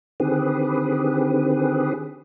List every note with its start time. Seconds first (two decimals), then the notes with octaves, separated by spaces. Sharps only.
0.20 D3 D#3 C4 G4 G#4 B4